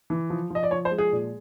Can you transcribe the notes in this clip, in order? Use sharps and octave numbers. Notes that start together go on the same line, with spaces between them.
E3
F3
F3 D#5
D5
F3 C#5
C5
G#3
G#4
A#2